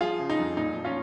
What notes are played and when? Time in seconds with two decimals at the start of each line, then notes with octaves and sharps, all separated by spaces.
0.01 F3 F4 G#4
0.19 C#3
0.30 D#4
0.39 F2
0.57 A#2 D#4
0.76 F3
0.84 C#4 F4